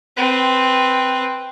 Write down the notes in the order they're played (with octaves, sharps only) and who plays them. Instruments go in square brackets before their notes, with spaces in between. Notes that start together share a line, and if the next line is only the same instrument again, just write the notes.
[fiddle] C4 B4